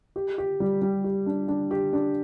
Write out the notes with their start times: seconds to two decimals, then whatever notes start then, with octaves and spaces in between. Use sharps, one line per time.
0.16 G4
0.38 G4
0.60 G3
0.82 G3
1.04 G4
1.26 D4
1.48 D4
1.71 G4
1.93 D4